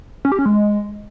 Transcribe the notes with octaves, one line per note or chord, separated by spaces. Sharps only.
C#4
G4
C#4
G#3